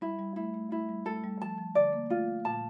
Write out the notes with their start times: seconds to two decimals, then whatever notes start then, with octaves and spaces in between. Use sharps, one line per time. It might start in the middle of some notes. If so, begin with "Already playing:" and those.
0.01 G3 E4
0.19 G3
0.36 A3 E4
0.54 A3
0.71 A3 E4
0.89 G3
1.06 A3 A4
1.24 G3
1.42 F3 A5
1.58 F3
1.75 D3 D5
1.93 A#3
2.10 A3 F4
2.45 A#2 A5